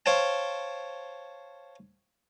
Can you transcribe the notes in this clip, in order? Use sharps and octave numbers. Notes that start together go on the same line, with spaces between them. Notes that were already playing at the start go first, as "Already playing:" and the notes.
C5 C#5 F5 G5 A5